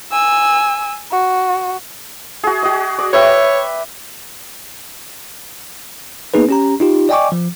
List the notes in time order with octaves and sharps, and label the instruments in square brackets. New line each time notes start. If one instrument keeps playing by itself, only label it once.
[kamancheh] G#5 E6
F#4
[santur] F#4 G#4
F#4 D#5
D5
[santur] B4 E5 G5 [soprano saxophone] C#5
[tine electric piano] A#3 B3 D#4 G#4 B4
C#4 G4 A#5
D#4 F4 G4
D5 D#5 G5 G#5 C#6 D6
F3